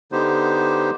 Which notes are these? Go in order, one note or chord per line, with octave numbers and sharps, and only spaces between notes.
D3 B3 D#4 G4 C5